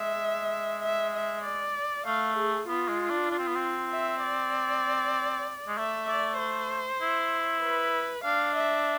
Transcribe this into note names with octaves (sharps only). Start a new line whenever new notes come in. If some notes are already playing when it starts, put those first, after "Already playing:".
Already playing: G#3 E5
E5
E5
D5
A3 F5
G#4
B3 F4
G#3
D4
D4
C4
B3
C4
E5
D5
G#3
A3 E5
D5
C5
E4
B4
D4 F5
E5